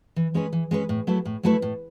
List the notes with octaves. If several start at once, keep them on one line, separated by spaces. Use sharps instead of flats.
E3
G#3 C#4 G#4 B4
E3
G#3 C#4 G#4 B4
A2
F#3 A3 E4 B4
A2
F#3 A3 E4 B4
A2